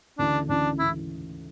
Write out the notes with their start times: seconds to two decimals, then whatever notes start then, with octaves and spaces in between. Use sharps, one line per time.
0.18 D2 C#3 E3 D4
0.49 D2 C#3 E3 D4
0.79 C#3 E3 E4